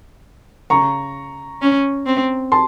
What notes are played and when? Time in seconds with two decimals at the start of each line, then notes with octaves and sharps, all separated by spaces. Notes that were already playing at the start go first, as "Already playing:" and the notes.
0.70 C#3 A#5 C#6
1.62 C#4
2.06 C4
2.52 A5 C6